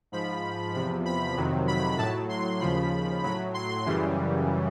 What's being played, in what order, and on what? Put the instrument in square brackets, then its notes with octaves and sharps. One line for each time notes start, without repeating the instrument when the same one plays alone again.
[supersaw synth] G#2 F3 B5
E2 C3 F3 B5
B5
F2 C3 D#3 F#3
B5
A2 F#3 A5
C6
D#2 C#3 F3 B5
A2 F#3 B5
C6
F#2 C#3 E3 G3